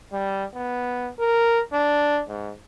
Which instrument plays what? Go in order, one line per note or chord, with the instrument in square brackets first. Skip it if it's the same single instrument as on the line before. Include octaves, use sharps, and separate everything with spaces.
[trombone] G3
B3
A#4
D4
G#2